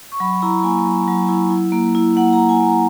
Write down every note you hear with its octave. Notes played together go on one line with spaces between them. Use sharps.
C#6
F#3 B5
E4 A#5
A#5
A#3 G#5
F#3
F#3
E4
E4
A#3
E4
A#3 F#5
A#5
E4
G#5
A#3
A#5